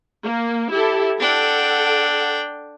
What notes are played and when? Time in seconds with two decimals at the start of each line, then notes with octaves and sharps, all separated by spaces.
0.23 A#3
0.70 E4 G4 A4
1.20 D4 A4 F#5 G5